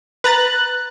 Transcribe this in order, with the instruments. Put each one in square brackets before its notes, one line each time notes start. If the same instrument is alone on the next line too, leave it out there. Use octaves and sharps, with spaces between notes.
[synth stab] B4 A#5 A6 [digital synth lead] F#6